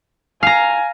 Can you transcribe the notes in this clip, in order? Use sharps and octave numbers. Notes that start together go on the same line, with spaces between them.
F5 G#5 A#5